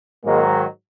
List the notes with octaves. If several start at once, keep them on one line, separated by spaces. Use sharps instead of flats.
G#2 D#3 F#3 G#3 A#3